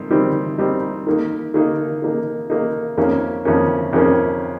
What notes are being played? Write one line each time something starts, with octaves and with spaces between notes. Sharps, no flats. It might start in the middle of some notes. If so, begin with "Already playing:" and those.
Already playing: D#3 G3 C4 D#4
D#3 G3 C4 D#4
D#3 G3 C4 D#4
D#3 A#3 D#4
D#3 A#3 D#4
D#3 A#3 D#4
D#3 A#3 D#4
F2 D#3 A#3 C#4
F2 D#3 A#3 C#4
F2 D#3 A#3 C#4